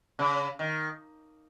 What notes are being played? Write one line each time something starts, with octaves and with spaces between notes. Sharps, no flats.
C#3
D#3